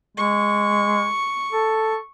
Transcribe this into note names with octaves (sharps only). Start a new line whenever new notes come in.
G#3 C#6
A4